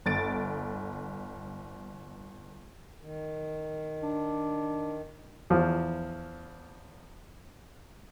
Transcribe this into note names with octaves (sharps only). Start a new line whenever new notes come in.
G1 A6 D7
D#3
D4
E2 F3